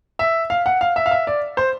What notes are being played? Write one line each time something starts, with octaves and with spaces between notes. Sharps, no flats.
E5
F5
F#5
F5
E5
F5
E5
D5
C5